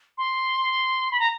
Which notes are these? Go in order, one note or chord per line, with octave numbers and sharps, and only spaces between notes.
C6
B5
A#5